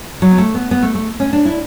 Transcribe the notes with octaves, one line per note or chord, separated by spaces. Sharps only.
F#3
B3
A3
B3
B3
A3
A3
C#4
D4
E4